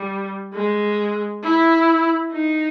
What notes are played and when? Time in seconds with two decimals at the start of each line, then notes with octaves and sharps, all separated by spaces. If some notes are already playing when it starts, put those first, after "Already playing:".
Already playing: G3
0.53 G#3
1.44 E4
2.33 D#4